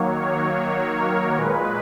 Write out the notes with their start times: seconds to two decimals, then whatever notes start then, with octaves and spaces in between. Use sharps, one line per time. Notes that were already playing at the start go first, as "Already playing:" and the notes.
Already playing: D#3 F#3 A#3 C#5
0.19 C#5
0.98 A#4
1.36 A#2 G#3 B4